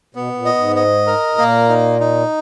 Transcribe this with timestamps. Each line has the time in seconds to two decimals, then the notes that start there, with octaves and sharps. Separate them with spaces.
0.15 B2 B3
0.35 A#2
0.45 D#5
0.56 G#2
0.76 D#5
1.07 A#4
1.30 G#2
1.37 A#2 A#3
1.69 D#4
2.00 D#4